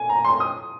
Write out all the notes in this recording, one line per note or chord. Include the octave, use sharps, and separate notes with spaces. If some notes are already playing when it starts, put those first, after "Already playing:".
Already playing: G#5
A#5
C6
D#6